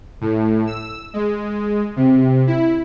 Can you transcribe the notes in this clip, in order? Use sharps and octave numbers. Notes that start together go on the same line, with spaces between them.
A2
E6
G#3
C3
E4